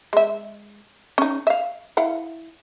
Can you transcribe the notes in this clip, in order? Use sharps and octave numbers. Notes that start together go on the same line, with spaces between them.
G#3 E5
C#4 D#4
E5 F5
E4 F5 F#5